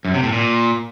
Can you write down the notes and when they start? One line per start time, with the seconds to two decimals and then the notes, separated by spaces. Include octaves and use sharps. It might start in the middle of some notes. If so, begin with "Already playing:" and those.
0.05 F#2
0.14 C3
0.23 A2
0.33 A#2